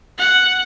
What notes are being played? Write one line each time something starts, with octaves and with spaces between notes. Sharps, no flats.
F#5